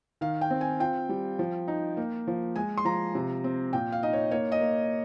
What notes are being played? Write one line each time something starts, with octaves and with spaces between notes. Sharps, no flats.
D#3 F5
G5
C4
G#5
F4 G5
G3
F3
D#4
A#3
F3
G#3 G#5
C6
F3 A#5
C3
C4
A#2 G5
F5
D#4 D#5
C#5
A#3 C#5
D#5
A#3